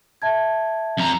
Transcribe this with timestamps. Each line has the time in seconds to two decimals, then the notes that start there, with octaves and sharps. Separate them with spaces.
0.22 E5 A5 G#6
0.98 F2 A#5